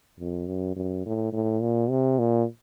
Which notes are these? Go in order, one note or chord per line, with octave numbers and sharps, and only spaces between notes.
F2
F#2
F#2
A2
A2
A#2
C3
A#2